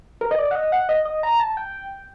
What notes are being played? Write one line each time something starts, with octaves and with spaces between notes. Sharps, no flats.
A#4
D#5
D5
F#5
D#5
F#5
D#5
D#5
A#5
A5
G5